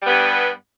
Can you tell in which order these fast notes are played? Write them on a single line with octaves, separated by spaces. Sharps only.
G3 B3 G2